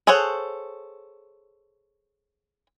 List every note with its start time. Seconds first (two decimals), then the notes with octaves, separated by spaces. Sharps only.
0.07 G#4 A4 C5 C#5 F#5